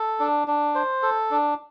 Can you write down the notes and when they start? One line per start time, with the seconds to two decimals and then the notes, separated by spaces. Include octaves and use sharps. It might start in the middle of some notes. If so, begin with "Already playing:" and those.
Already playing: A4
0.20 D4
0.48 D4
0.75 C5
1.03 A4
1.31 D4